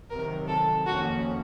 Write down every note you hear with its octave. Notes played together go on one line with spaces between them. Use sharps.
C3 D#3 F#3 A#4
A4
F2 D#3 A#3 C#4 F#4